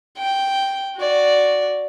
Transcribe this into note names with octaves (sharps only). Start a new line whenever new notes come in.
G5
F#4 D5